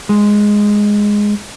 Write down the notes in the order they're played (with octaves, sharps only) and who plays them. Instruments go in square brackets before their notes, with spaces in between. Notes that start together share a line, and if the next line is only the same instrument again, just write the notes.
[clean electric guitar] G#3